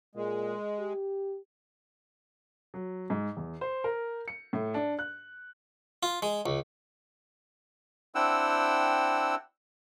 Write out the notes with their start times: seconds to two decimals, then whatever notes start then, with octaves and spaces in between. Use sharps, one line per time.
0.15 A#2 G#3
0.79 G4
2.74 F#3
3.10 G#2
3.37 E2
3.61 C5
3.84 A#4
4.28 C#7
4.53 A2
4.74 D4
4.99 F#6
6.03 F4
6.22 G#3
6.46 C#2
8.15 C4 D4 E4 F#5 G5 E6